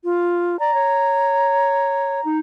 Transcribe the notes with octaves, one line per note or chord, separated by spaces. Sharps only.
F4
D5 A#5
C#5
D#4